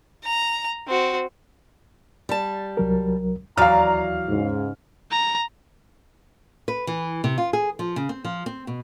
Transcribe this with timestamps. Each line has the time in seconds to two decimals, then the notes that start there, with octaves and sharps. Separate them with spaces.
0.24 A#5
0.87 C4 F#4
2.29 G3 A5
2.77 C2 F#3 A#4
3.57 D#2 E3 F#3 D5 F5 A#5 F6
4.29 G#2 C#3
5.11 A#5
6.68 B4
6.87 E3
7.24 C3
7.38 F4
7.53 G#4
7.79 F3
7.96 C#3
8.09 C4
8.25 F3
8.46 C4
8.67 B2